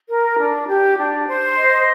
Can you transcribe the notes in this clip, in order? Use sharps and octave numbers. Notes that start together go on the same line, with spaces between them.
A#4
D4
G4
D4
C5
D#5